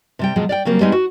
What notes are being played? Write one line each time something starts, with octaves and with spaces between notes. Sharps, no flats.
C3 G3 G5
B2 F3 F#3 G#3
D5 F5 G5
C#3 F#3 G3 A#3 C4
G3 G#3 B3 C4 D#4
F#4